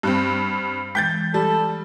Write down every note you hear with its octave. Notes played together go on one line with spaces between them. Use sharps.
G2 C4
E3 G#3 G5 G6 A6
G3 A4